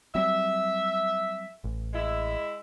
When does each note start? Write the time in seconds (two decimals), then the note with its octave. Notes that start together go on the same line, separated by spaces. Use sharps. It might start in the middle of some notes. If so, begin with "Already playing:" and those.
0.15 F#3 G3 C4 E5
1.64 A1
1.94 G#3 E4